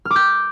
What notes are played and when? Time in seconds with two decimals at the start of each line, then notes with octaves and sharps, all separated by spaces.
0.05 F6
0.11 D6
0.16 G6